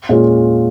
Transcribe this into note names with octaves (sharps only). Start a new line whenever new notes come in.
A#2 G#3 C#4 F4